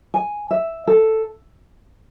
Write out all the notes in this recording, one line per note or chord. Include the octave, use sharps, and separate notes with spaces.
G#5
E5
A4